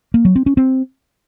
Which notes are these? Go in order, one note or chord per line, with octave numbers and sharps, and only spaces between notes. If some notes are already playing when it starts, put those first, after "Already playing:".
A#3
F#3
C4
C#4
C4